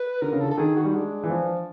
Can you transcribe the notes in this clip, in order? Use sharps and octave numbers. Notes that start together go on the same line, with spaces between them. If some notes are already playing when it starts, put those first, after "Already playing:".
Already playing: B4
D3 A#4
C#3
A4
D3
A4
D#3 G#4
F#4
G3
G#3 D4
E3
F3